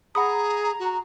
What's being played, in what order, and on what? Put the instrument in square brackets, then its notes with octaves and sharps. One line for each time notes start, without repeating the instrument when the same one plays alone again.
[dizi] G#4 [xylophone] F#5 B5 D#6 [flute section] A#5
[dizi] F#4